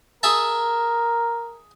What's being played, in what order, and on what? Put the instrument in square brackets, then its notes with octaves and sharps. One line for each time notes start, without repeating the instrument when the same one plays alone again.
[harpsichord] G#4 E5 A5 [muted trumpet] A#4